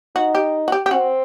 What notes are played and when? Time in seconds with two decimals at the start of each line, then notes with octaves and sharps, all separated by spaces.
0.16 D#4 F#4
0.35 G4
0.68 F#4
0.72 G4
0.86 G4
0.91 C4 F#4